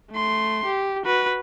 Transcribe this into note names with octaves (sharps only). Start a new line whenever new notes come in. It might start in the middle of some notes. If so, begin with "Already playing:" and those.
A3 C6
G4
F#4 B4